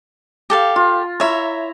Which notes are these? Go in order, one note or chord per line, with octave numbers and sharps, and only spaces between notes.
G4 A4 F5
F4
E4 C#5 E5 A#5